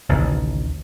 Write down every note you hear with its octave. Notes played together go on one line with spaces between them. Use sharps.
A1 D2 C3 D#3